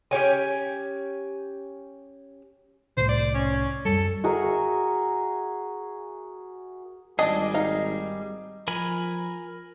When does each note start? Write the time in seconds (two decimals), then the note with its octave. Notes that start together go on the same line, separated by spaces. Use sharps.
0.11 C#4 G4 C#5 G#5
2.97 C2 A2 C3 C5
3.09 D5
3.34 C#4
3.85 F#2 G3 A4
4.24 F#4 G#4 A#4 E5
7.19 G#1 G3 D4 G#4 D#5
7.54 D#4 F5
8.68 F3 A#4 G#5 B5